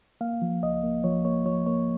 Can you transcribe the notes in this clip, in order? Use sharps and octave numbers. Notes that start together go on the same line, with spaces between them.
A#3 F5
F3
C#2 D#5
A#3
F3 C#5
A#3 C#5
F3 C#5
A#3 C#5